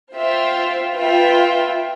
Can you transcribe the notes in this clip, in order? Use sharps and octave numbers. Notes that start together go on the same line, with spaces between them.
F4 C5 E5 G5
F4 B4 E5 G5